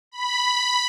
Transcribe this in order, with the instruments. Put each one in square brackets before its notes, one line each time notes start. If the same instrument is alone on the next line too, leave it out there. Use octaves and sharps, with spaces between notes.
[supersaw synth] B5